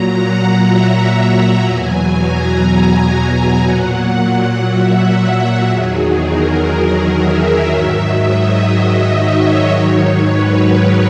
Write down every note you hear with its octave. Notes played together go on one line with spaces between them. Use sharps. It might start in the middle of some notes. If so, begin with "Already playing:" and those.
Already playing: A#2 F#3 A#5
F#5
E5
F#5
E2 B2 F#3 G#5
A#5
A#2 F#3 F#5
E5
E2 D#3 F#3 G#4
A#4
E5
G#2 D#3 F#3
D#5
C#5
G#2 D#3 F#3
B4
A#4